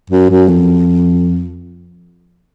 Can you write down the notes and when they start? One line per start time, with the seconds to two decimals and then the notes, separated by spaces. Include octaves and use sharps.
0.10 F#2
0.30 F#2
0.48 F2